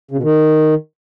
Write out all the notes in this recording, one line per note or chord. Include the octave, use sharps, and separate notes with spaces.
C#3
B2
D#3